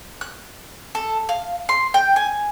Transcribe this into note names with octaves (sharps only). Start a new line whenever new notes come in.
F#6
A4
F5
C6
G5
G#5